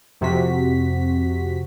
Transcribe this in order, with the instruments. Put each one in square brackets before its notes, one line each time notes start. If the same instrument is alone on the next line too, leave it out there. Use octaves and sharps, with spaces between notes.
[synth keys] F2 C3 F#4 B6